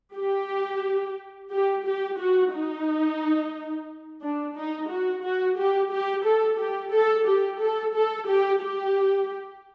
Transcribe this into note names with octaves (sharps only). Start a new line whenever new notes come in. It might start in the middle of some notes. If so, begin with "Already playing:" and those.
G4
G4
G4
F#4
D#4
D4
D#4
F#4
F#4
G4
G4
A4
G4
A4
G4
A4
A4
G4
G4